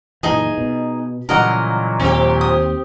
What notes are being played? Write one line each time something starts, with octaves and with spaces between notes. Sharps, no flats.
F#1 A#2 E3 D#4 G#4
B2
A#2 C#3 E3 F#3 G3 A#4 D#5 F#5
D#2 C4 G4
D#6